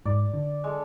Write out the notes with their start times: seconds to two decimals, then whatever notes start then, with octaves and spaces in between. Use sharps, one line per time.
0.05 G#2 D5
0.34 D3
0.64 G#3 D4 A4